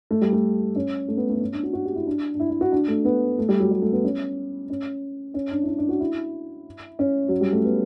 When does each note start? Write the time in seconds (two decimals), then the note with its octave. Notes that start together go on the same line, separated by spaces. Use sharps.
0.11 A3
0.21 G3
0.33 A3
0.76 C#4
1.08 A3
1.17 B3
1.29 A3
1.33 B3
1.41 C#4
1.53 D4
1.63 F#4
1.73 F#4
1.85 G4
1.96 E4
2.07 D4
2.35 D4
2.40 E4
2.50 E4
2.61 F#4
2.72 D4
2.88 A3
3.05 B3
3.39 A3
3.49 G3
3.60 F#3
3.71 G3
3.82 A3
3.92 B3
4.04 C#4
4.70 C#4
5.34 C#4
5.51 D4
5.63 E4
5.68 D4
5.78 D4
5.89 F#4
6.00 E4
6.99 C#4
7.29 F#3
7.41 G3
7.53 A3
7.65 B3